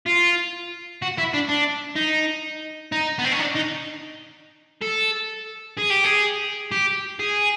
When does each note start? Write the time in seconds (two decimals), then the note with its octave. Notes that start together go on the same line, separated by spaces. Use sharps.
0.06 F4
1.02 F#4
1.18 E4
1.34 D4
1.49 D4
1.96 D#4
2.92 D#4
3.19 B3
3.24 C4
3.32 C#4
3.39 D4
3.55 D#4
4.82 A4
5.77 G#4
5.90 G4
6.04 G#4
6.72 G4
7.19 G#4